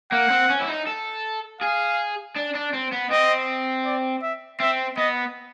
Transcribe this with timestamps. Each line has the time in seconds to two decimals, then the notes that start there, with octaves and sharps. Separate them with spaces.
0.12 A#3 F#5
0.30 C4
0.50 C#4
0.60 E4
0.68 D#4
0.86 A4
1.61 G#4 F5
2.36 D4
2.55 D4
2.73 C4
2.92 B3
3.11 C4 D#5
3.86 D5
4.22 E5
4.60 C4 E5
4.97 B3 D#5